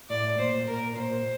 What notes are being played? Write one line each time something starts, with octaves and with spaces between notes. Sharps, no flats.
A2 D5
A#2 C5
A#2 A#4
A#2 C5